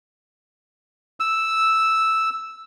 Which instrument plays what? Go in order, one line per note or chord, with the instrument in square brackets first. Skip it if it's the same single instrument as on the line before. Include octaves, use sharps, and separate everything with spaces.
[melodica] E6